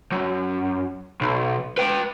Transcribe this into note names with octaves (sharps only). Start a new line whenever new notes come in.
F#2
B1
B4 G5